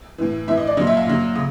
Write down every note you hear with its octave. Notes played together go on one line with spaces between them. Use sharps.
A2 E3
A2 E3 E5
D#5
D5
A#2 F#3 D#5
E5
F5
A#2 F#3
C#3